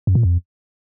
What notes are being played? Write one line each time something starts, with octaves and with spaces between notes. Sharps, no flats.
F#2
A#2
F2